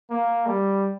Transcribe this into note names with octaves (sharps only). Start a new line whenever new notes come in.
A#3
G3